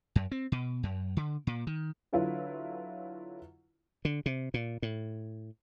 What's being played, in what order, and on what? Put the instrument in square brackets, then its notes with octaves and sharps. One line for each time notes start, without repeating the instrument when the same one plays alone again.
[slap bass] F#2
C4
B2
F#2
D3
A#2
D#3
[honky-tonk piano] D3 F#3 E4 F4 B4
[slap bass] D3
C3
A#2
A2